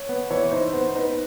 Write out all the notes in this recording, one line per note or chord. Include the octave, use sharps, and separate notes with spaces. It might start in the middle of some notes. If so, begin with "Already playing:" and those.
Already playing: C#5
B3
E3 C#5
D#4 C5
B3 C5
D#4 B4